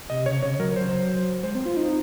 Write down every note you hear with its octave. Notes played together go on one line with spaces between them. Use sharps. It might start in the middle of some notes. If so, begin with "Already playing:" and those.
C3 D#5
C#3 C#5
C3
C#3 C#5
F#3 A#4
F#3 C5
G#3 C5
C4
C5
F4
D#4